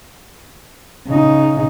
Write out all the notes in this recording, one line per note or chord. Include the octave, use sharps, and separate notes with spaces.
C#3 D#4